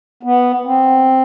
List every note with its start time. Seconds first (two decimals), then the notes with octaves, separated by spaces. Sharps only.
0.23 B3
0.65 C4